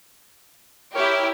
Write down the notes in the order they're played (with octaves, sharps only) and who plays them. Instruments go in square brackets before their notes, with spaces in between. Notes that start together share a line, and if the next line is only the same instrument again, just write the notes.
[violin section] E4 G4 [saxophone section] A#4 C#5